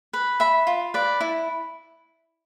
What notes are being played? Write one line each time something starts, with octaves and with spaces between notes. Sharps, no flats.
B4
E5 B5
F4
B4 D5
E4